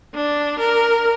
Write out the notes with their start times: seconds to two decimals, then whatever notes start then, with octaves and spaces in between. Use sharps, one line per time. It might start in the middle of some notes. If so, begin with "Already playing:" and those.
0.15 D4
0.59 A#4